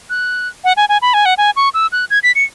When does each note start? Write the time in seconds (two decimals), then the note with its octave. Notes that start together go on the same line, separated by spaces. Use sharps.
0.10 F#6
0.64 F#5
0.77 G#5
0.89 G#5
1.02 B5
1.14 G#5
1.26 F#5
1.38 G#5
1.56 C#6
1.74 E6
1.92 F#6
2.10 G#6
2.23 B6
2.35 C#7